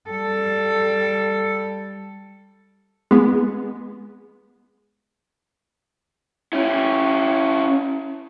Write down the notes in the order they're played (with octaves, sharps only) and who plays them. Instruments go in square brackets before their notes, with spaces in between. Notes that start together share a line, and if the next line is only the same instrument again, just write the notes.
[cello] G3 A4
[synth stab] G#3 B3
[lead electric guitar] C#4 E4